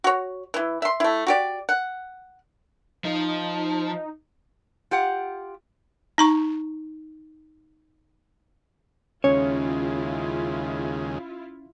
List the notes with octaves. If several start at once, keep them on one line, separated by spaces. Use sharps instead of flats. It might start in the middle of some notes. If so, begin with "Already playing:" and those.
F#4 C#5
E3 E4
E5 C6
A3 E4
F#4 G4 D5
F#5
F3 D#4
F4 G4 F#5
D#4 A#5 C#6
D#2 C#3 G#3 C#4 E4 F4 C#5